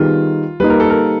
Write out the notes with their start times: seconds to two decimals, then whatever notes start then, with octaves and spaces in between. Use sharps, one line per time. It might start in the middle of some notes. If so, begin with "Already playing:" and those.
Already playing: D#3 G3 B3 D#4 F4 G#4
0.60 G3 A#3 D#4 B4
0.70 A#4
0.80 A4
0.90 A#4